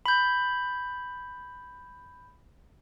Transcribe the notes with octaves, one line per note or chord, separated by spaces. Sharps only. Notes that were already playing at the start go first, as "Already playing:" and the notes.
B5 G6